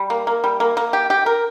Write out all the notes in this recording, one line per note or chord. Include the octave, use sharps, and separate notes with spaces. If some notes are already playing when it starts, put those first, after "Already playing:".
Already playing: G3
A#3
A#3
G3
A#3
A#3
G4
G4
A#4